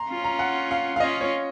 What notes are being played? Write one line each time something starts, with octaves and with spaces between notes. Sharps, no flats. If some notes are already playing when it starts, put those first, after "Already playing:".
Already playing: A#5 C6
C#4 F4
A#5
F#5
F5
F5
C#4 F4 D#5
C#5